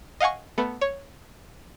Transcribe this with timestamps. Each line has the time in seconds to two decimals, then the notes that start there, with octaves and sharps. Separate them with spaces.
0.21 D#5 F5 F#5 G#5 C#6
0.58 A3 B3
0.81 C#5